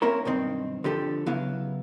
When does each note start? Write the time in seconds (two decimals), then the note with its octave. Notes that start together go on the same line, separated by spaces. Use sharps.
0.02 A#3 C4 C#4 E4 A#4
0.25 B1 G2 D#3 C4
0.84 D3 F3 G4 A4
1.26 C#3 F#3 B3 E4 F5